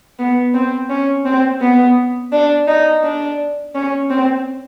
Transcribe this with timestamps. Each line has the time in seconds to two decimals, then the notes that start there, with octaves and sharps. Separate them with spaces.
0.19 B3
0.54 C4
0.90 C#4
1.26 C4
1.61 B3
2.32 D4
2.68 D#4
3.03 D4
3.75 C#4
4.10 C4